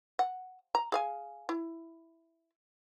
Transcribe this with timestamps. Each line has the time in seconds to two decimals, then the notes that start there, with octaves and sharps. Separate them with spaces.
0.19 F#5
0.75 A#5
0.92 G#4 F5 G#5
1.49 E4